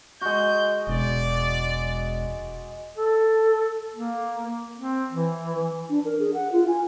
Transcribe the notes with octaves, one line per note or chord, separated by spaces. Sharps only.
G#3 F#4 G6
E1 D5
A4
A#3
C4
E3
D4
A#4
G#4
F#5
F4
G#5